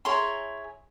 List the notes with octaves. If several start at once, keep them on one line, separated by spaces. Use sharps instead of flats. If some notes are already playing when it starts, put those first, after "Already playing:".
E4 G#4 C#5 A#5 C6